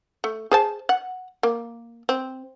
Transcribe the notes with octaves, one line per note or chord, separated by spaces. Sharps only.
A3
G#4 C5 A5
F#5
A#3
C4